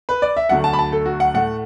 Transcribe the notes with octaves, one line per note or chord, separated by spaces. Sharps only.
B4
D5
E5
D2 D3 F#3 A3 F#5
A5
B5
A5
A4
F#4
F#5
A2 A3 F#5